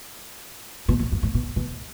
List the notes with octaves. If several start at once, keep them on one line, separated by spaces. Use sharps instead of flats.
B2
A#2
G2
G#2
B2
B2